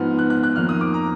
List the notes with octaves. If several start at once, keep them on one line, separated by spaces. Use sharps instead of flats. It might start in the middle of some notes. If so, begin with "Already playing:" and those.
Already playing: G#2 F3 B3 F6
F#6
F#6
F#6
F2 D#3 A#3 F6
D#6
D6
A#5